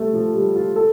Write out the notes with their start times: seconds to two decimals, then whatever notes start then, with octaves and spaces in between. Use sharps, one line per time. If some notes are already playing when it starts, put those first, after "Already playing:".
Already playing: G3 A3
0.14 F3
0.34 G3
0.55 F4
0.76 A4